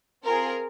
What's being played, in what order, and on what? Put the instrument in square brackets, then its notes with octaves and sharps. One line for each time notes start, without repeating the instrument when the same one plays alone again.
[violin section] C4 F4 G#4 A#4